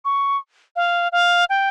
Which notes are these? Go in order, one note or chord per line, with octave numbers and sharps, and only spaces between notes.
C#6
F5
F5
G5